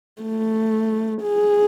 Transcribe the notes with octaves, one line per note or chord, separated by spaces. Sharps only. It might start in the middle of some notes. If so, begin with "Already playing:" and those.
A3
G#4